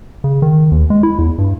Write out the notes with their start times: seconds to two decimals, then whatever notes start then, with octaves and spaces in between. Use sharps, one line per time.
0.24 C#3
0.42 D#3
0.72 D#2
0.90 G#3
1.03 E4
1.19 E2
1.38 G2